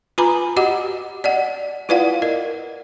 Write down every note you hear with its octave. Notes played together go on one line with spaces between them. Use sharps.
F4 B4 G#5 A#5 B5 D6
F#4 G4 D#5 F#5 D6
D5 D#5 F#5
E4 F4 B4 D5 F5 F#5
A#4 D#5